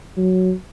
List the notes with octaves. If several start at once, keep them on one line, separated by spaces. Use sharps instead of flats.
F#3